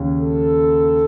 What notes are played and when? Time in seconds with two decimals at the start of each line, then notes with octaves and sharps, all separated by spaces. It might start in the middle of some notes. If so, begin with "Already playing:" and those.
Already playing: D#2 C#3 C#4
0.20 A4